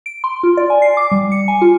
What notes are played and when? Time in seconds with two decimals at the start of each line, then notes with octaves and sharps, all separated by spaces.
0.06 D7
0.24 C6
0.43 F4
0.57 D5
0.70 G#5
0.82 C7
0.97 D6
1.12 G3
1.32 C#7
1.48 G#5
1.62 F4